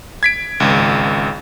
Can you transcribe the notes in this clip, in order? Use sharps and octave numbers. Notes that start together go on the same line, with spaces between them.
G#6 B6 D7
G#1 C#2